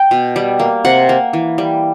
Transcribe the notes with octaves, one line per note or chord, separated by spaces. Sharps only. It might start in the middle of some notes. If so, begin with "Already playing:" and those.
Already playing: G5
B2
G3
A#3
C3 F#5
A#3
E3
G3